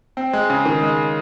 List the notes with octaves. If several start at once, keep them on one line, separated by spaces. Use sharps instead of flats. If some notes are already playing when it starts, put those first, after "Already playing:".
C4
G#3
C#3
D#3
G#3